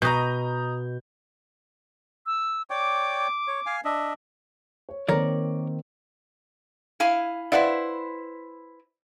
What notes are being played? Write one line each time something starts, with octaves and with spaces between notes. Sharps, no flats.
B2 D#5 A#5 D#6 G6
E6
C#5 D5 G5 D6
C#5
F5 G#5
D4 D#5 E5
C#5
D#3 A#3 C4 A#4 C#5 D5
E4 F5 G#5
E4 B4 C5 D5 F5 F#5